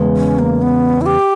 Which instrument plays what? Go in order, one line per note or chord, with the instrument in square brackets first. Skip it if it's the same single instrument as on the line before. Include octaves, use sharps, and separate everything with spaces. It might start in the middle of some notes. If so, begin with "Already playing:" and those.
Already playing: [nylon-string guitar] E2 C#3 G#3
[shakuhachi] C#4
A#3
B3
E4
G4